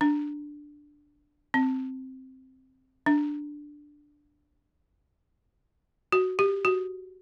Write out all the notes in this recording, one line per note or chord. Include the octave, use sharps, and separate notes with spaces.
D4
C4
D4
F#4
G4
F#4